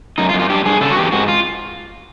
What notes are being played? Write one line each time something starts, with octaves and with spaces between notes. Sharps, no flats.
F#2 D#4
F4
F#2
F4
G2 G4
G2 G#4
C#3 A4
F#4
E2 G4
G#2 F#4
F4